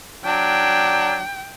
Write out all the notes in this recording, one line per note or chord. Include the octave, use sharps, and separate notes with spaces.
F#3 D4 G5